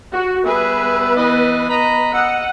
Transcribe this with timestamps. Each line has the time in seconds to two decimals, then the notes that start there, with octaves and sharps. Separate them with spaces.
0.13 F#4
0.45 G3 B3 G#4 B4 E5
1.16 E3 D#5
1.69 D#5 A#5 B5
2.13 D#5 F#5 E6